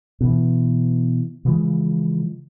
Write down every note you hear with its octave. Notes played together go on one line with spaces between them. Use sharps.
B2 E3
C#3 E3 F3 G#3